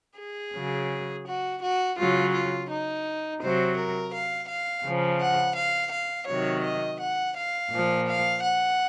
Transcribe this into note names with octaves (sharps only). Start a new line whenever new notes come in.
G#4
C#3 F#3
F#4
F#4
C#3 F#3 F4
F4
D#4
C3 F#3 C5
A#4
F5
F5
C#3 F3
F#5
F5
F5
C3 D#3 F#3 C#5
D#5
F#5
F5
A#2 F3
F5
F#5